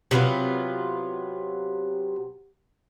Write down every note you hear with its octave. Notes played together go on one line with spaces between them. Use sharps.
C3 F#3 B3 F4